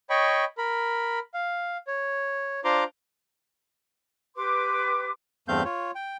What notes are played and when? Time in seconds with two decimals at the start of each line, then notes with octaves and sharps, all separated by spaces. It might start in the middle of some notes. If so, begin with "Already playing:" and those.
0.10 C#5 D#5 G5 B5 C#6
0.58 A#4 B5
1.34 F5
1.87 C#5
2.64 D4 F4 C5 A#5 C6 D6
4.35 G4 B4 C6 D6
5.48 E2 G2 A3 C4 F5 G6
5.65 F4 C#5
5.95 G5